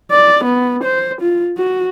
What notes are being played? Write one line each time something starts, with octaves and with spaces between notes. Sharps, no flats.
D5
B3
C5
F4
F#4